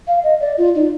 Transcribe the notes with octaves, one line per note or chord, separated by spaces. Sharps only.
F5
D#5
D5
F4
D#4